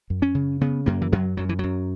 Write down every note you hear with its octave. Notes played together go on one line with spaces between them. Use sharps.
F#2
C#4
C#3
C#3 B3
F#2 A#3
E3
F#2 F#3
F#2 F#3
E3
F#2 F#3